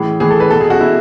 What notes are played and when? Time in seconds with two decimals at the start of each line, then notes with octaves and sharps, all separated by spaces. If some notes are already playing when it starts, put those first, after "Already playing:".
Already playing: A2 E3 G#4
0.20 A2 E3 G#4
0.30 A4
0.40 B4
0.50 B2 A4
0.60 G#4
0.70 F#4
0.79 B2 E4